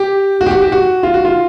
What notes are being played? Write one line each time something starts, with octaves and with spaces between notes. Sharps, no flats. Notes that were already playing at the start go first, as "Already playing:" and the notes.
Already playing: G4
F#4
G4
F#4
G4
F#4
F4
F#4
F4